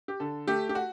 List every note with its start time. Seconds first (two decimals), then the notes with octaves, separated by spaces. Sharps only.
0.08 G4
0.20 D3 A4
0.48 A3 G4
0.69 G4
0.75 F#4